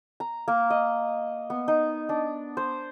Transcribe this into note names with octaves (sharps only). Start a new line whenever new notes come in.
A#5
A#3
D#5
B3
D#4
D4
C5